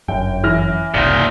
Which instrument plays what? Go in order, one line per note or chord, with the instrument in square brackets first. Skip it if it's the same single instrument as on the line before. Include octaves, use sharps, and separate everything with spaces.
[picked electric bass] G1 F#2 [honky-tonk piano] G5
[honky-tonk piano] E3 F6 A#6
[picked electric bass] F#1 C2 [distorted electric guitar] A#2 D#4